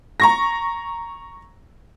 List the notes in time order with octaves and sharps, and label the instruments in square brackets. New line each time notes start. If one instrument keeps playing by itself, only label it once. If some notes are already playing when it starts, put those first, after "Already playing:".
[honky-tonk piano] A#5 C#6 A#6